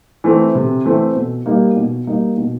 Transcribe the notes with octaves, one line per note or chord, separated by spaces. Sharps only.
E3 A3 C4
C3
E3 A3 C4
B2
G3 A#3 D#4
B2
G3 A#3 D#4
B2